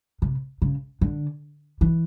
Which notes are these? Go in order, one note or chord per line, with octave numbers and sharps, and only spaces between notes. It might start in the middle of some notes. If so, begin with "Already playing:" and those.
C3
C#3
D3
E3